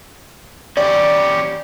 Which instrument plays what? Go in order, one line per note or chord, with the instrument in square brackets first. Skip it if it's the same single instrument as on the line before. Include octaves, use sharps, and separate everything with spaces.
[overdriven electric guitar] C#4 G4 [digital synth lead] D5